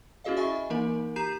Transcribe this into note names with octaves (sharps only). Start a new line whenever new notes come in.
C#4 E4 F#4 G#4 D#5 F5
D#5 E5 G#5 B5 C#6 A6
E3 A#3 D#4 A#4
G4 A#5 G6 C7 D#7 E7